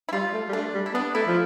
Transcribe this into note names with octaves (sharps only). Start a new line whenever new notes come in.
E4
G3 F4
A3
G3
A3 D4
G3
E4
B3 D4
A3 E4
F3